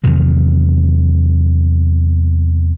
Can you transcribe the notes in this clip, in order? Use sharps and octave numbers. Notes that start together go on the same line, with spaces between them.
E2 C3 D#3 F#3